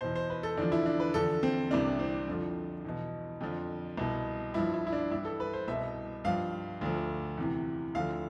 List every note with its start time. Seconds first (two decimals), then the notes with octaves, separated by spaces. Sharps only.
0.01 E2 B2 C5
0.15 C5
0.30 B4
0.43 A4
0.57 E2 D3 F3 D4
0.72 E4
0.86 D4
1.00 B4
1.14 E2 D3 F3 A4
1.43 C4
1.71 C2 C3 E3 D4
1.99 C4
2.27 F2 D3 F3
2.85 E2 B2
3.41 F2 D3 F3
3.97 C2 B2
4.54 G2 F3 E4
4.74 E4
4.87 E4
4.92 D4
5.11 G2 E3 E4
5.25 A4
5.40 B4
5.53 C5
5.68 C2 B2 E5
6.24 G2 F3 F5
6.81 D2 D3 F3
7.37 E2 C3 E3
7.95 D2 D3 F3 F5